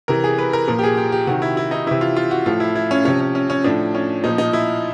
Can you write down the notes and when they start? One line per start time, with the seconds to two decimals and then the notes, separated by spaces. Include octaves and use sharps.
0.08 C3 E3 A#4
0.24 G#4
0.38 B4
0.53 A#4
0.68 A#2 F3 A#4
0.79 G4
0.83 G#4
0.97 G4
1.12 G4
1.27 C3 D#3 F#4
1.42 E4
1.57 E4
1.71 D#4
1.87 C3 E3 E4
2.01 F4
2.17 F4
2.31 F#4
2.46 A2 F3 F4
2.60 E4
2.75 E4
2.91 C#4
3.05 C3 F3 C#4
3.20 C#4
3.35 C#4
3.50 C#4
3.64 A2 F3 D4
3.94 C#4
4.24 A#2 F3 D#4
4.38 D#4
4.53 E4